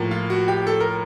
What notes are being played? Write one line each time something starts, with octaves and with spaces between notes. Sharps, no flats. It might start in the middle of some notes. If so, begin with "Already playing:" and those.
Already playing: A2 F3 A#3
F4
F#4
G4
A4
A#4